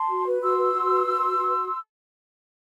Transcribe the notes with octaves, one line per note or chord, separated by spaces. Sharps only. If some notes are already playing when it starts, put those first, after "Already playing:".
Already playing: A5 C6
F#4
B4
F#4 C6 E6
B4
F#4
B4
F#4
B4
F#4